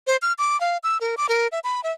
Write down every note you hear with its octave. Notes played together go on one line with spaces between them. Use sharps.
C5
F6
D6
F5
E6
A#4
D6
A#4
E5
B5
E5